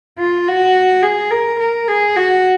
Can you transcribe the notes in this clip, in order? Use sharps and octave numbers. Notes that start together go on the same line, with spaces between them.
F4
F#4
G#4
A#4
A#4
G#4
F#4